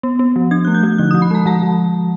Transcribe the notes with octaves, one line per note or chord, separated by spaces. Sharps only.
B3
B3
F3
D4 G#6
A3 F#6
G6
F3
D3 F#6
D#6
F3
B5
G#3 A#5
F3 A5
F3